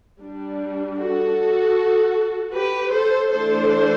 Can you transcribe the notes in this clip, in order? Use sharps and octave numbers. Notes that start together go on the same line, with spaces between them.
G3 D4
F#4 A4
G4 B4
A4 C5
E3 A3 D4 A4 C5